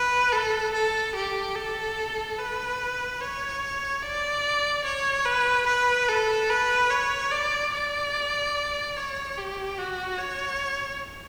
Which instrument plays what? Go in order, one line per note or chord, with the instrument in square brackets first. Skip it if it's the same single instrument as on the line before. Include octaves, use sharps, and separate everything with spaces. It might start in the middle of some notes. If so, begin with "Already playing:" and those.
Already playing: [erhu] B4
A4
A4
G4
A4
B4
C#5
D5
C#5
B4
B4
A4
B4
C#5
D5
D5
C#5
G4
F#4
C#5